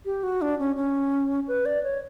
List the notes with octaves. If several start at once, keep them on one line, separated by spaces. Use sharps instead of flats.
G4
F#4
D4
C#4
C#4
B4
D5
C#5